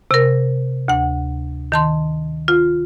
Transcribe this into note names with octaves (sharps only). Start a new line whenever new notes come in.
C3 A#4
D2 F#5
D#3 A5 C6
F4